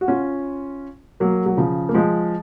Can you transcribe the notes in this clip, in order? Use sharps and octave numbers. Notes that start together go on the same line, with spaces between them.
F#4
C#4 F4
F#3 A#3
F#3
C#3 F3
A#3
F3 G#3